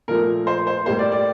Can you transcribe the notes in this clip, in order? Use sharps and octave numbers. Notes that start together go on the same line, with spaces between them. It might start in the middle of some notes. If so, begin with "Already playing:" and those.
A#2 F3 A3 A#4
C5
C5
A2 G3 A#3 C5
D5
D5